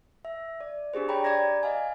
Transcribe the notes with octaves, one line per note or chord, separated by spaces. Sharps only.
E5
D5
D4 G4 G#4 C5
C#5 D5 G5 A#5 B5
D5 A#5 G#6 A#6
D#5 F5 G#5